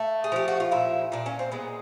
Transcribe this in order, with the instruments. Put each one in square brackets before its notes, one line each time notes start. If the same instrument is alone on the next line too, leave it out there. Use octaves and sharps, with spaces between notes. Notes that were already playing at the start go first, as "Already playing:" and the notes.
Already playing: [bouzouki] A3
G#4
F3 G4
F#4
F4
A#2 E4
A#2 D4
C#4
C4
G#3 B3